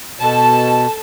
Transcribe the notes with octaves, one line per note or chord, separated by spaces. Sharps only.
B2 A4 A5